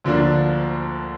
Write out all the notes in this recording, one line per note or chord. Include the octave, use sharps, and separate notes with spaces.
D2 D3 F3 A#3 D4